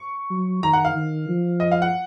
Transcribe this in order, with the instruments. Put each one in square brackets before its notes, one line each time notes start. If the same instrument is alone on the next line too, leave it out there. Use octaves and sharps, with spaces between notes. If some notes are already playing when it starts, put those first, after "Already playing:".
Already playing: [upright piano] C#6
[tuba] F#3
[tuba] D#3 [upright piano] A#5
[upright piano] F#5
F5
[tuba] D#3
F3
[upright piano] D#5
F5
F#5